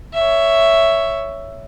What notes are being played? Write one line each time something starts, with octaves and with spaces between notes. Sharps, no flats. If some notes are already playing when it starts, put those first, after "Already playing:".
C#5 E5